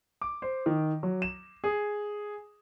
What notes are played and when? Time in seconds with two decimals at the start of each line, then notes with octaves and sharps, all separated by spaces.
0.22 D6
0.42 C5
0.66 D#3
1.03 F#3
1.22 E7
1.64 G#4